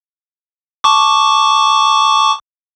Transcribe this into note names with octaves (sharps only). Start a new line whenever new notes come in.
A5 C#6 D6